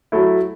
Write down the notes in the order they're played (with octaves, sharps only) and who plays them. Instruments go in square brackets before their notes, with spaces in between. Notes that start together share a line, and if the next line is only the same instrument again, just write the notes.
[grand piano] F#3 A3 E4